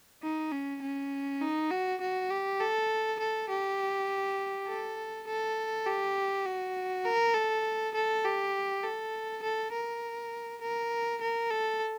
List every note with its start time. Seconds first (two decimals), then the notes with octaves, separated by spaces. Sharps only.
0.23 D#4
0.52 C#4
0.82 C#4
1.41 D#4
1.71 F#4
2.01 F#4
2.30 G4
2.61 A4
3.20 A4
3.49 G4
4.68 A4
5.27 A4
5.87 G4
6.46 F#4
7.06 A#4
7.35 A4
7.94 A4
8.25 G4
8.84 A4
9.43 A4
9.73 A#4
10.61 A#4
11.21 A#4
11.51 A4